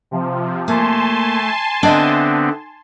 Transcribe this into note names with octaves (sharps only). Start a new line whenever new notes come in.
C3 F3
A3 A#3 G#5 A5 C6
D3 B3 C4 D4 D#5 E5